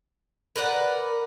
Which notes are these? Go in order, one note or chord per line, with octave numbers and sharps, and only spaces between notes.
A#4 B4 D5 F#5